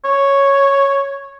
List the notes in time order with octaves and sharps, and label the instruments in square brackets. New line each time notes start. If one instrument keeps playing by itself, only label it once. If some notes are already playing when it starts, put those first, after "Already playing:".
[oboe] C#5